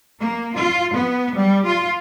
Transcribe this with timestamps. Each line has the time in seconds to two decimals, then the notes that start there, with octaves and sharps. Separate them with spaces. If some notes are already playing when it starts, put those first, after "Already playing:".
0.20 A#3
0.56 F4
0.94 B3
1.37 G3
1.66 F4